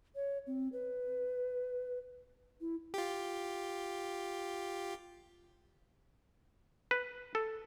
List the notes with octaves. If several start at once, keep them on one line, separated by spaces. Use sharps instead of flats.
C#5
C4
B4
E4
F4 G4
B4
A4